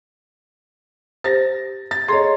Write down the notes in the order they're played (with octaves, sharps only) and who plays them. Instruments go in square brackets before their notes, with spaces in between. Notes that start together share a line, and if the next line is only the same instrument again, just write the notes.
[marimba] G4 C5 [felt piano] A6 A#6
[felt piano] A6
[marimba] G#4 A4 D#5 [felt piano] C#5 A#5 C6